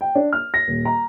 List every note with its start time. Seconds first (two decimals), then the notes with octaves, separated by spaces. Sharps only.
0.01 G5
0.15 D4
0.33 F6
0.54 A#6
0.68 D#1
0.85 A#5